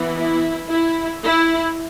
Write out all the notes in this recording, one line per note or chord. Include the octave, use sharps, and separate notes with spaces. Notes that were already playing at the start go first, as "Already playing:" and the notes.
Already playing: E3 B3
E4
E4
E4